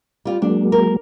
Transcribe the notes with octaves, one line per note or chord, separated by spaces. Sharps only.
G3 F4
F#3 G#3 A#3 D4
A#4